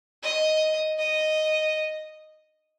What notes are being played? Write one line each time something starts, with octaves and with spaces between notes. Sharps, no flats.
D#5
D#5